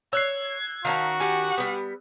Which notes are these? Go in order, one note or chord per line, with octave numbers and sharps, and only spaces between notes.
C#5 E6 F#6 G#6 C7
D#3 C#4 F#4 A#4 F5 A5
G4 F#5 G#5
G3 B3